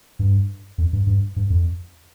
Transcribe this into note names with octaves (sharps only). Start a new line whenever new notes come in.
G2
F2
G2
G2
G2
F2